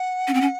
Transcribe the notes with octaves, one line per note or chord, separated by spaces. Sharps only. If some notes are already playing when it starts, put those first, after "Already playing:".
Already playing: F#5
C#4
C4
C#4